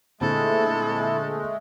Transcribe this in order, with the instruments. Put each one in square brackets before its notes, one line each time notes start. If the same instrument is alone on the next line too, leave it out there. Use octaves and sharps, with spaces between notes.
[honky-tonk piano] A#2 D3 C4 [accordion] G#3 A3 [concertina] E4 [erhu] A4